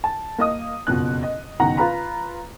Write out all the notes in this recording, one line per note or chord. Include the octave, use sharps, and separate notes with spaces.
A5
A#3 D#5 D#6
F#1 F2 B2 F#6
D#5
F#1 B2 D#3 F#5 A#5
F4 B4 F5 A#5 B5